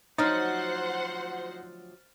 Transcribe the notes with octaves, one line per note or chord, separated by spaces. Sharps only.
D2 F3 F#3 D#4 C5 F#5 F6 A6